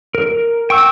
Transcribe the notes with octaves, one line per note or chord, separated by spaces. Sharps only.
A#4
G5 C#6 E6